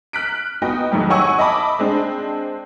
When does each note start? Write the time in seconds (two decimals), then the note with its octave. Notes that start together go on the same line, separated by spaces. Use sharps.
0.13 F6 F#6 B6 D7
0.62 B3 D#4 F#4 D#5 G5
0.92 F2 G#2 D#3 F#3 G3
1.10 C#5 F#5 G#5 C#6 E6
1.39 D#5 E5 A5 B5 D6
1.79 G#3 C4 D4